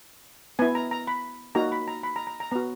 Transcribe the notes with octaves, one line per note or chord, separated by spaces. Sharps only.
B3 E4 G#5
A#5
A#5
B5
A#3 D#4 F#4 A#5
B5
A#5
B5
A#5
A#5
A#5
B3 F#4 A#5